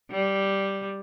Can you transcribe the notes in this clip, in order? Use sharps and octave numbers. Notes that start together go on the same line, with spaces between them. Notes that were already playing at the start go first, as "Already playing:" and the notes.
G3